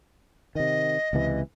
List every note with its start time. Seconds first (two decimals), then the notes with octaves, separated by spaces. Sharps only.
0.55 C3 D#3 D#5
1.13 C#2 C3 E3